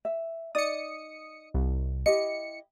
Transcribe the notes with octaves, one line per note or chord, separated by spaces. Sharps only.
E5
D#4 D5 D#5 D#6 C#7
C2
E4 G4 D#5 C#7